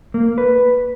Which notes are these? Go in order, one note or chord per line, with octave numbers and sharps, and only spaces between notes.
A#3
B4